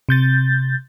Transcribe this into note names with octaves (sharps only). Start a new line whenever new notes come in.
C3 G6 A6